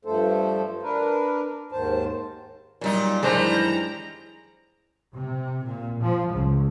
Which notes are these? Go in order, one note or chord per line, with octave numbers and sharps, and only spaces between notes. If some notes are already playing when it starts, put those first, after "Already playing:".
G2 F3 A3 A4 C5
D4 A#4 B4
D#2 G#2 D#3 C5 A5
A#2 F#3 G3 D#4
F#2 D#3 E3 G3 G#3 D4 C5 A#5
C3
A#2
F3
C#2